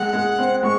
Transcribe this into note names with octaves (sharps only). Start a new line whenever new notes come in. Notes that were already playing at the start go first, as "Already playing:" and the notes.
Already playing: G#3 F#5
G#3
C4
G#3 C#6